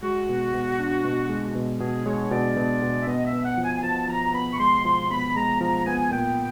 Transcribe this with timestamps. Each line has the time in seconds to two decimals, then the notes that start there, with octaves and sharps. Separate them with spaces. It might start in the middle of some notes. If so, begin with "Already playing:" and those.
0.03 G#3 F#4
0.29 B2
0.54 B2
0.79 D4
1.05 B2
1.29 G#3
1.55 B2
1.80 B2 G#4
2.06 G#3 C#5
2.31 B2 D5
2.57 B2
2.83 B2
3.02 E5
3.07 B3 D#5
3.26 E5
3.33 B3
3.45 F#5
3.57 F3
3.64 G#5
3.78 G#5
3.83 F3 A5
4.08 F3 A#5
4.34 B3 B5
4.52 C#6
4.60 G#3 C6
4.84 F3 C6
5.10 B3 B5
5.36 G#3 A#5
5.60 F3 A#5
5.86 B3 G#5
6.11 A#2 G5